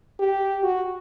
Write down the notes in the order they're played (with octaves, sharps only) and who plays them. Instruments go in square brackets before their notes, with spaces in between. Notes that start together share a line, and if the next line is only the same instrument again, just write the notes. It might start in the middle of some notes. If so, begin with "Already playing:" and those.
[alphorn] G4
F#4